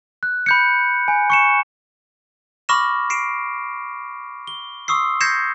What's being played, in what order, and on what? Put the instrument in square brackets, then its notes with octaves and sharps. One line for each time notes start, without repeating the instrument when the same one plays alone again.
[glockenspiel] F#6
B5 G6 C#7
G#5
C#6 C#7 E7
B5 C#6 D6 F6 A#6 E7
C7 D7 E7
G7
C6 C#6 D#6 E6 C7
G6 G#6 A#6 C7 C#7 E7